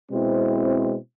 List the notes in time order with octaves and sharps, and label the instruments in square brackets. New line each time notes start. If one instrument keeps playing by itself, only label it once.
[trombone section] B2 G#3 C4 E4